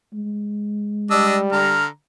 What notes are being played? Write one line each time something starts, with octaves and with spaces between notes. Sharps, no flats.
G#3
G3 D4 D#5 E6
D3 A#5 F6